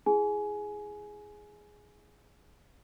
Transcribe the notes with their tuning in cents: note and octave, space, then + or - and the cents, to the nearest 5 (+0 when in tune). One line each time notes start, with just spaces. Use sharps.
E4 +0 G#4 +0 G#5 +20